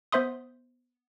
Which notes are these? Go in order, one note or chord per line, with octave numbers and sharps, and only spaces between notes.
B3 C5 E5 C6 D#6